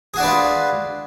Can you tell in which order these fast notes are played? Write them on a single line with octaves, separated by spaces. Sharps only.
G#4 F#4 D4 B4 F4